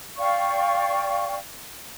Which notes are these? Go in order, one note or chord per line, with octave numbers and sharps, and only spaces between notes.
D5 F5 G5 C#6